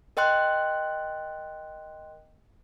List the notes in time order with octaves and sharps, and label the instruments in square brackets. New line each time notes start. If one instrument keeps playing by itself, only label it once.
[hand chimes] A#4 D#5 G5 C6 F#6